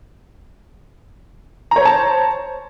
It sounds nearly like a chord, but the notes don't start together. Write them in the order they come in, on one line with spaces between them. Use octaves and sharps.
A#5 C#5 C5 A5